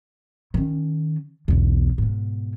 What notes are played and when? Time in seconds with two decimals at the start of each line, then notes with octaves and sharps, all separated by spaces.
0.54 D#3 C#4
1.48 B1 E2
1.98 G#2 B2